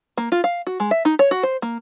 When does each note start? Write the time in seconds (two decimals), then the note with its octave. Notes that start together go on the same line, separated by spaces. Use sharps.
0.18 A#3
0.32 F4
0.44 F5
0.67 F#4
0.80 G#3
0.91 E5
1.05 D#4
1.19 C#5
1.31 F#4
1.43 C5
1.62 A#3